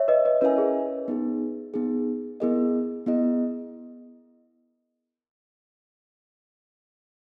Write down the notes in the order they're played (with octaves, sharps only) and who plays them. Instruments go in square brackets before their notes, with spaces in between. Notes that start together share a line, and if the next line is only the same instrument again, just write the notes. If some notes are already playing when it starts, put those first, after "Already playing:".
Already playing: [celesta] C#5 E5
B4 D#5
B4 D#5
[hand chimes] C#4 E4 A#4 E5 G#5 [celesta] B4
[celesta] G#4
[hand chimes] B3 D#4 G#4
B3 D#4 G#4
[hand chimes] B3 E4 G#4 D#5 [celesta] A#4
[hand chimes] B3 E4 G#4 D#5